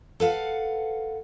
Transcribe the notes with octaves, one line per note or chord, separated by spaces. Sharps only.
A4 B4 F5 F#5